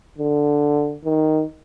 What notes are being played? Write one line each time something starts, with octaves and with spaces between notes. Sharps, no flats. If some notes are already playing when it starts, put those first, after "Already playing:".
D3
D#3